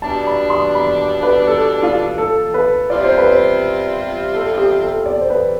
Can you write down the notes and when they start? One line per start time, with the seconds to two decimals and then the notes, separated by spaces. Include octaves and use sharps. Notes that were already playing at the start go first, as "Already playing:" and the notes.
0.02 B2 G3 D4 A5
0.27 B5
0.50 C6
0.75 B5
1.23 B4
1.47 A4
1.83 F4
2.18 A4
2.54 B4
2.90 C3 G3 C4 F4 D5
3.04 C5
3.18 B4
3.31 C5
4.34 A4
4.58 G4
4.82 A4
5.06 D5
5.21 C5
5.30 B4